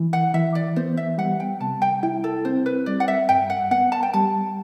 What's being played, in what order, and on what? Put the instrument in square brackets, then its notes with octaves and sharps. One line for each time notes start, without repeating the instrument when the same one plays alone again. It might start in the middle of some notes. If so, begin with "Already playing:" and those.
Already playing: [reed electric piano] E3
[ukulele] F#5
[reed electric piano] E3 [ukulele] E5
[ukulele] D5
[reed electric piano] B3 [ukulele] C5
[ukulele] E5
[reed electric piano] G3 [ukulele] F#5
[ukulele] G5
[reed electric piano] C3 [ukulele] A5
[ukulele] G5
[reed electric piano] E4 [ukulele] G5
[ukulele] A4
[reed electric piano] C4 [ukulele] C5
[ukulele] B4
[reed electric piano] G3 [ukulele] D5
[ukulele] F#5
E5
[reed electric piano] G2 [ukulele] G5
[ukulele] F#5
[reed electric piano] B3 [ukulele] F#5
[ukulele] A5
G5
[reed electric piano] G3 [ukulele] A5